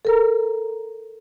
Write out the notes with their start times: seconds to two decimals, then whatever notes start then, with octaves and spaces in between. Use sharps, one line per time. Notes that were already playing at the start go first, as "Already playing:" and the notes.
0.05 A4 A#4 A#5